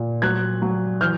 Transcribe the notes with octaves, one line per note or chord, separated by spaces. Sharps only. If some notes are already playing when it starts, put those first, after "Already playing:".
Already playing: A#2
F#3 F#6 G#6
F#3
E3 F6 G6